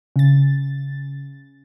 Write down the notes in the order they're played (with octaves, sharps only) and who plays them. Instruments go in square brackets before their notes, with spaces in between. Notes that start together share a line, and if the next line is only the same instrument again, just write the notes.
[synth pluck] C#3 A6